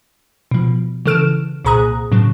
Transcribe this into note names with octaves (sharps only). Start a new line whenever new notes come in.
B2 F3
C#3 E3 A4 F6 D7 E7
C2 A#2 G#4 A#5 D#6 F#6
A2 C#3 F#3